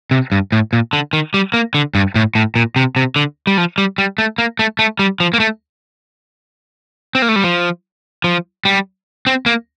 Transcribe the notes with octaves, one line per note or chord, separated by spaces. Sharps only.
C3
G2
A2
A#2
D3
D#3
G3
A#3
D3
G2
A2
A2
A#2
C3
C3
D3
G3
F3
G3
G3
A3
A#3
A3
A3
G3
F3
A#3
A3
C4
A#3
A3
G3
F3
F3
G3
C4
A#3